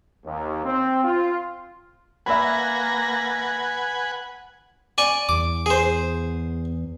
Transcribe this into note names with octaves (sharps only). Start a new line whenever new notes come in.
D#2
C4
F4
A#3 B4 E5 F#5 G#5 B5 A#6
D5 G#5 C#6
E2 D6
G#4 C5